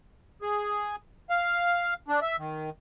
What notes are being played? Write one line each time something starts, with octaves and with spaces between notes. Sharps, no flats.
G#4
F5
D4
E5
D#3